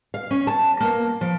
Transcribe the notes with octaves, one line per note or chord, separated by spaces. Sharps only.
F5
C#4
A5
A#3
F3